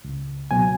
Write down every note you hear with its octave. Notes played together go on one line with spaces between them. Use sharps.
C#2
B2 F#3 G#5